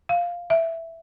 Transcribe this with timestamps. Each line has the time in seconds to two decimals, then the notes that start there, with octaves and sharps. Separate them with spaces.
0.09 F5
0.50 E5